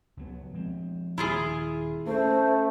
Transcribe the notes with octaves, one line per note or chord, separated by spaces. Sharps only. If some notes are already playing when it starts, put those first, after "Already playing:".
C#2 F#3 B3
F3 G#3 C4
D#1 E4 F4 G#4
A3 C#4 D4 C5